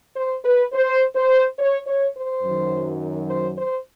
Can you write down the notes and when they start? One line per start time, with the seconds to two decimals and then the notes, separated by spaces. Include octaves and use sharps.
0.16 C5
0.44 B4
0.73 C5
1.15 C5
1.58 C#5
1.86 C#5
2.15 C5
2.43 F#2 D#3 F#3
3.29 C5
3.58 C5